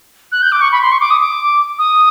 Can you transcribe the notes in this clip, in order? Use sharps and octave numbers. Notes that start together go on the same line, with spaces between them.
F#6
G6
D6
C#6
B5
C6
C#6
D6
D#6
D6
D#6